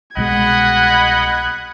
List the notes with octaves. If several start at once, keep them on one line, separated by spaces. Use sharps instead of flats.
C2 B2 G#3 D#5 F#5 B5 F#6 G#6